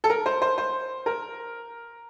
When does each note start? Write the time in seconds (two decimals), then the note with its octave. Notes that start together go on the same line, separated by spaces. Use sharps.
0.04 A4
0.10 A#4
0.26 C5
0.42 C5
0.58 C5
1.06 A#4